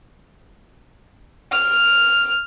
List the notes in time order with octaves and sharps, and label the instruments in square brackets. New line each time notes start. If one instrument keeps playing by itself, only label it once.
[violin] F6